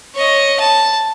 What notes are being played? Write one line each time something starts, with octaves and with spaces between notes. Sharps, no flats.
C#5 D#5
A5